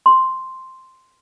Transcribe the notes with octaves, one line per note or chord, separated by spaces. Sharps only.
C6